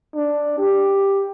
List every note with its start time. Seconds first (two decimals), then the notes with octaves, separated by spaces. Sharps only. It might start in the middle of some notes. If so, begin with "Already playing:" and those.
0.15 D4
0.58 G4